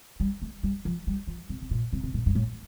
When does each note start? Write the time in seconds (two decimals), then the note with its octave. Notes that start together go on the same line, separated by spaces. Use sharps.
0.20 G3
0.42 A3
0.63 G3
0.85 F3
1.07 G3
1.27 F3
1.49 C3
1.62 C3
1.71 A#2
1.93 C3
2.03 C3
2.14 A#2
2.26 G2
2.35 A2